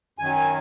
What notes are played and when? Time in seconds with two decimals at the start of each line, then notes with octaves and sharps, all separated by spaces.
0.19 F#2 D#3 F#3 G#5